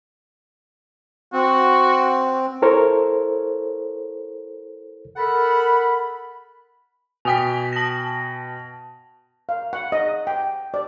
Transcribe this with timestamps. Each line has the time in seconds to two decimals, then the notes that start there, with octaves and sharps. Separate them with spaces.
1.33 C4 F#4
2.62 E4 A4 A#4 C5 C#5
5.17 A4 A#4 F#5 B5
7.25 B2 G5 G#5 D#6 B6
7.73 A5 A#6
9.49 F5
9.73 F#5
9.92 D#5
10.27 G5
10.74 D5